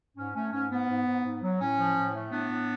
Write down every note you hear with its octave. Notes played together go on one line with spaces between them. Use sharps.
G#2 C#4
A3 C#4
G#2 C#4
G#2 B3
G#2
G#2
G#2
F#3
A2 C#4
F3
A2
A3
A2 B3 D4
A2